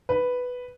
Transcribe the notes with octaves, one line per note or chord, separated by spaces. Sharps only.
B4